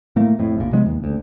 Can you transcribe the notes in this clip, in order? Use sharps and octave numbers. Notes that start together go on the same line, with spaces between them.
A2 A3 A#3
F2 A2
F1 A#1 A#2
C3 F3 G#3 B3
D#2
D#1 D2